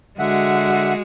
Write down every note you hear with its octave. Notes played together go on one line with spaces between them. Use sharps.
D3 G#3 F#4 E5 F#5